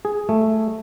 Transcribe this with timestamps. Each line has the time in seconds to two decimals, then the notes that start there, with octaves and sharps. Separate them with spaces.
0.05 G#4
0.29 A3